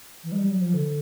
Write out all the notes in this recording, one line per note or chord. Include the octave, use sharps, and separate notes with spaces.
E3
G#3
G3
F#3
F3
D3